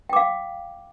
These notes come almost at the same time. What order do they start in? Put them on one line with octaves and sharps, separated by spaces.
G5 D6 F5